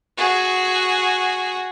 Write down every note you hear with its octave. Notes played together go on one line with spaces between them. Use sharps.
F#4 G#4